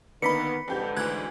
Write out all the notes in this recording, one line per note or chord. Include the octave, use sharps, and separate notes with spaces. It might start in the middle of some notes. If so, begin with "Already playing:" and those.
D3 D#3 A#3 B3 B4 B5 B6 C#7
F2 G#2 D3 G4 G6
D2 E3 F#6 G#6